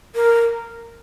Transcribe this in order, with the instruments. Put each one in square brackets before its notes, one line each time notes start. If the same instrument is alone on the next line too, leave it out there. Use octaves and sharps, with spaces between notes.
[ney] A#4